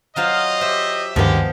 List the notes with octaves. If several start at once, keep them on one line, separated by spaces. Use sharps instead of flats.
F#3 F4 C5 D#5 F5
G4 C5 E5
D2 G2 D#3 F3 G#3 B3 G4